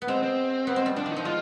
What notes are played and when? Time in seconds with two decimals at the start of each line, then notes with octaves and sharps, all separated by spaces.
0.02 B3
0.08 G#3 C4
0.23 C4
0.67 B3
0.76 G#3
0.86 G3
0.96 F3 D4
1.06 D#3
1.11 D#4
1.16 F3
1.25 G#3 F4